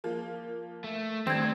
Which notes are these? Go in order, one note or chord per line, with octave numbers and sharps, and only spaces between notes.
F3 A#3
A3
D#3 G3 A3 C4 D4 G#6 E7